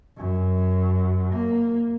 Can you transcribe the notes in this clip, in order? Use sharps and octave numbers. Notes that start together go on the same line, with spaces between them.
F#2
A#3